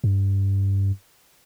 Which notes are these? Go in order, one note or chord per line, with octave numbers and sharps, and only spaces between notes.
G2